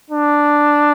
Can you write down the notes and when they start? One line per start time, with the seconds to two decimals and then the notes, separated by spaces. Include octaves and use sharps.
0.10 D4